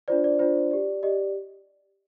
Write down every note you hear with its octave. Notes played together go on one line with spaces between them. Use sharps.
D4 F4 C5 D5
D5
D4 F4 C5
G4 D5
G4 D5 D#5